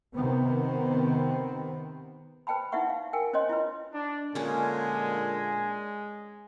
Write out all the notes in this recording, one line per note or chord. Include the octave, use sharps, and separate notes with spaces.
C3 D#3 B3 C4
B4 C5 G5 A5 B5
D#4 E4 B4 E5 F#5 C#6
F5
A#4 G5 G#5
C#4 C5 C#5 D#5 C6
E4 F4 B4
D4
A#2 D3 G#3 C#4 G#4 G#5